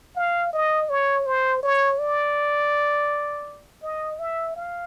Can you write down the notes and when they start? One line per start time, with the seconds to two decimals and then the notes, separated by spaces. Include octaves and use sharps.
0.16 F5
0.53 D#5
0.90 C#5
1.26 C5
1.63 C#5
1.99 D5
3.82 D#5
4.19 E5
4.56 F5